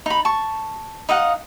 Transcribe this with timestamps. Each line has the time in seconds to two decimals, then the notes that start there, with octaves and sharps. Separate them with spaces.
0.06 D#4 B5
0.25 A5 C#6
1.09 D#4 D#5 F5 F#5